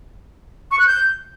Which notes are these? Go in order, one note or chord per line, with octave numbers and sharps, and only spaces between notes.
C#6
F#6
G6